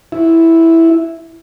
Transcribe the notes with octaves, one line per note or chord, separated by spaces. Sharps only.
E4